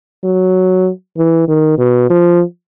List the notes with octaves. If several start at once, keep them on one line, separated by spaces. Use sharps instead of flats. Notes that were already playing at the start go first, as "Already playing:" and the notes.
F#3
E3
D#3
B2
F3